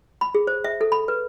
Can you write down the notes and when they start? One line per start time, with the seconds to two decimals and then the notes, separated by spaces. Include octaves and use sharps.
0.21 B5
0.35 G#4
0.47 C5
0.64 E5
0.81 A4
0.92 B5
1.08 B4